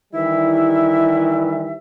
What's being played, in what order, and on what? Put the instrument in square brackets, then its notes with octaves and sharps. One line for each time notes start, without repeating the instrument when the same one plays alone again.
[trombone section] D#3 E3 G3 [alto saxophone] E4 [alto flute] E5